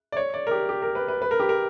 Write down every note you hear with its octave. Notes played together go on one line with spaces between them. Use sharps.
D5
C#5
D5
A#4
G4
G4
A#4
B4
B4
B4
A#4
G4
A#4